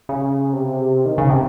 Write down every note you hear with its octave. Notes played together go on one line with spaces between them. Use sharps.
C#3
C3
D#3
C#3
C3